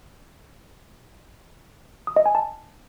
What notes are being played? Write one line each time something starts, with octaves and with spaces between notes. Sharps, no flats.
D#6
D#5
G#5
A5